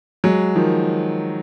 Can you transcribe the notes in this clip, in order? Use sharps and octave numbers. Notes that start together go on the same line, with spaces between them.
F#3 G#3
D#3 F3